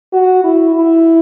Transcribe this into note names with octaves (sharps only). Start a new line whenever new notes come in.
F#4
E4
E4